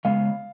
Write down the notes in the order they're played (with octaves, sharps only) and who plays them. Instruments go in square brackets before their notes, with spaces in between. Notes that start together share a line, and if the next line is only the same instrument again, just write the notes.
[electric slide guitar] C#3 G#3 B3 [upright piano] F5